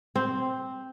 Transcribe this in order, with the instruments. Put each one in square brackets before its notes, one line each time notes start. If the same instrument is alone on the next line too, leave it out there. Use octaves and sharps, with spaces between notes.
[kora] C4